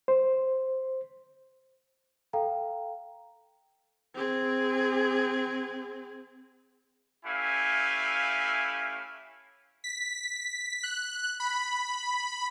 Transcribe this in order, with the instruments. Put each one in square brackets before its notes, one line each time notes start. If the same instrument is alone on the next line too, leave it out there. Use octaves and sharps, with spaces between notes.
[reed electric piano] C5
[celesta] A4 F5 G5 A#5
[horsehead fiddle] C4 G#4
[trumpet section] A3 C#4 E4 G4 F5 G#5
[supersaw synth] B6
F#6
B5